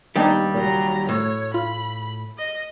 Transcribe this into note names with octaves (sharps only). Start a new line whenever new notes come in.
D#2 G3 B3 D4 D#4 G4
C#2 A#2 F#3 A#5
A2 C#5
F4 B5
D#5